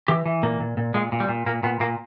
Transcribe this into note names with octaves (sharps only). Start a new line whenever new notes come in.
E3 G4
E3
A#2 A#3
A#2
A#2
A#2 G#3
A#2
G3
A#2
A#2 A#3
A#2 B3
A#2 A#3